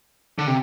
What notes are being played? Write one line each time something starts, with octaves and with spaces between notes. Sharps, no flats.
D3
C3